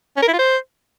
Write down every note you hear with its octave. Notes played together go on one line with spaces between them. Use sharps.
C#4
A#4
E4
F4
C5